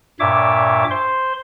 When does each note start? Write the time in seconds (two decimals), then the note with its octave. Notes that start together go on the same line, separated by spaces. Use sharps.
0.20 G2 A#2 C#5 E5 D6
0.91 C5 C6